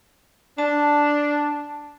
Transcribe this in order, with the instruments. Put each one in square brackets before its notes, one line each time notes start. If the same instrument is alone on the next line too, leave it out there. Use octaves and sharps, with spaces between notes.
[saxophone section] D4 [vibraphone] A5